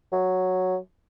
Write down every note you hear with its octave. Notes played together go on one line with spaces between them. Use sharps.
F#3